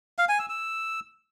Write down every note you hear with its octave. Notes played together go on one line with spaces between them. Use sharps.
F5
G#5
E6
E6